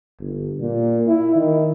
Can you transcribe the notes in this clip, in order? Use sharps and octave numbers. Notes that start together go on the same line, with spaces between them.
G1
A#2
E4
D#3